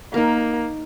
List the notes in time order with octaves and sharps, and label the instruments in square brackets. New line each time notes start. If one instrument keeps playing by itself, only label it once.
[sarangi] A#3 [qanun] D#4 A#4